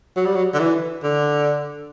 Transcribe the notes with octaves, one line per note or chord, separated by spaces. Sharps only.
F#3
G3
F#3
D3
E3
D3